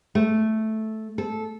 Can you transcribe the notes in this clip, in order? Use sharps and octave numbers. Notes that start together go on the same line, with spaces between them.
A3
A4